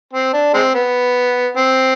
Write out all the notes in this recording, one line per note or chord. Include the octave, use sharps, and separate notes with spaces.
C4
D4
G#3 C4
B3
C4